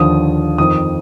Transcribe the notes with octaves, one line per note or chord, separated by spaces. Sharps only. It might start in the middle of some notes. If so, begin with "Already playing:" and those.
Already playing: D#2 D3 F3 D#6
F2 D#3 D#6